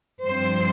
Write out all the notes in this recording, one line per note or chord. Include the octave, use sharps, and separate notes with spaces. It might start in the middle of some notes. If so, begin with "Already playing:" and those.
G2 F3 C4 C5